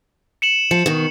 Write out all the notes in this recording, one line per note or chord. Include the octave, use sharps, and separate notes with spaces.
C#7 E7 F#7
F3 C#7
B2 D#3